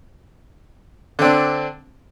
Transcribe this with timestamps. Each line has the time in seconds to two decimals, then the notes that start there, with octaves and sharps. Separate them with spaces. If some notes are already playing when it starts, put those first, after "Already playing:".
1.19 D3
1.22 C4
1.24 D4